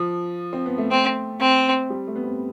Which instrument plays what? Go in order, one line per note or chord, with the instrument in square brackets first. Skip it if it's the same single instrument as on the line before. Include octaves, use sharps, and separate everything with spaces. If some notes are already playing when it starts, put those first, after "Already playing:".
Already playing: [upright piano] F3
C4
B3
A3
[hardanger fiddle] C4
C4
[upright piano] G3
A3
B3
C4